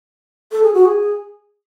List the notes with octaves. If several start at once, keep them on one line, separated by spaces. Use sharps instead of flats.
A4
G#4
F#4
G#4